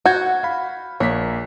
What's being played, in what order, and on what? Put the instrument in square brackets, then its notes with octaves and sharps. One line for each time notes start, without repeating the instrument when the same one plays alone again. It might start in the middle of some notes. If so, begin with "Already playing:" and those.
[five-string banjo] F#4 [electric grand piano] F#5 G6 G#6
[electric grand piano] F5 B5
[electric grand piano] A#1 A#3 B6 [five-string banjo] C#5